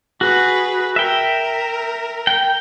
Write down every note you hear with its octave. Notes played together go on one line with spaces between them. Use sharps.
F#4 G#4 B4
A#4 E5 G5
G5